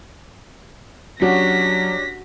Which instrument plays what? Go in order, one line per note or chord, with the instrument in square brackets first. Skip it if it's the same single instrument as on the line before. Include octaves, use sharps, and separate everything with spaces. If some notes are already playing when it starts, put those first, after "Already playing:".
[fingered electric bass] F#3 [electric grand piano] C#4 D4 G4 [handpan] F#4 [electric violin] A#6 B6